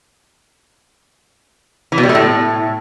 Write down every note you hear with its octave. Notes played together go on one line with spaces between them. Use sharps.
E3
B2
G3
A3
A2